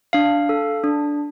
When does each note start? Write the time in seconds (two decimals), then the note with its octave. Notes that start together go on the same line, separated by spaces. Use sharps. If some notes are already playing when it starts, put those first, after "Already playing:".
0.13 D4 F5
0.49 A4
0.84 D4